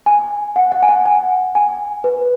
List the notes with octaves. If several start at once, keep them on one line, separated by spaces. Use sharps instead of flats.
G#5
F#5
F#5
G#5
F#5
G#5
G#5
B4